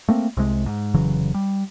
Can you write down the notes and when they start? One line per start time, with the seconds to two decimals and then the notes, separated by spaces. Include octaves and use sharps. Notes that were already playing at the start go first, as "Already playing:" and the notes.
0.08 A3 A#3 C4
0.37 C2 C3 G#3
0.66 G#2
0.94 F1 C#3 E3 F#3
1.34 G3